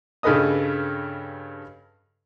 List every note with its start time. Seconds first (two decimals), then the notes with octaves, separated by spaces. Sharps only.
0.23 G2 C#3 A4 B4 D#5 D#6